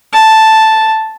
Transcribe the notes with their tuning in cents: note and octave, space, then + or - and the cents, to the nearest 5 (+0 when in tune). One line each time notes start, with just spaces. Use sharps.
A5 +0